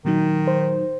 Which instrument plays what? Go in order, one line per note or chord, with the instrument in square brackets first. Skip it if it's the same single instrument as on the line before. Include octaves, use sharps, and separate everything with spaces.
[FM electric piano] A#2 F#3 D#4 [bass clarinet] D#3
[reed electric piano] C5